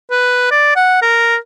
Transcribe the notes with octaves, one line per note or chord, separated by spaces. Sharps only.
B4
D5
F#5
A#4